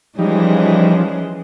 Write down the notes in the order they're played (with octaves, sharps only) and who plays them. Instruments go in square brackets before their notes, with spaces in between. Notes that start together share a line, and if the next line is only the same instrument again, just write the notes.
[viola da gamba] E3 G#3 C#4 [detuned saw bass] F3 [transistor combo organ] G3 D#4